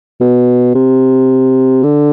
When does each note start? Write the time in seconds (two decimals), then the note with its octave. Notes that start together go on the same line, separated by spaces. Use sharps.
0.20 B2
0.75 C3
1.83 D3